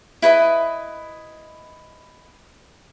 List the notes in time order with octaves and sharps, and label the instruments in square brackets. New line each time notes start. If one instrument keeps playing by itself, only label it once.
[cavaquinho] E4 B4 D#5